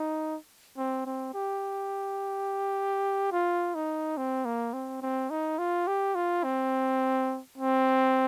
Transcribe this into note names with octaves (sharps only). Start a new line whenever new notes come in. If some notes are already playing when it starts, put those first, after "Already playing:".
Already playing: D#4
C4
C4
G4
F4
D#4
C4
A#3
C4
C4
D#4
F4
G4
F4
C4
C4